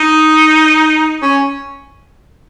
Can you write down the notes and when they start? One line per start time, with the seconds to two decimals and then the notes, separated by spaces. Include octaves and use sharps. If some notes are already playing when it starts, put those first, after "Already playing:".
Already playing: D#4
1.22 C#4